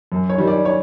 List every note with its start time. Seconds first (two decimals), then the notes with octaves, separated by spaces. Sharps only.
0.12 F#2
0.30 C#5
0.38 D#3 G3
0.47 D5
0.65 C#5